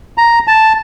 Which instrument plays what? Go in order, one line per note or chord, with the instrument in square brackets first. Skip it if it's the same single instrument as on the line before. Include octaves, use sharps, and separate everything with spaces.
[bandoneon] A#5
A5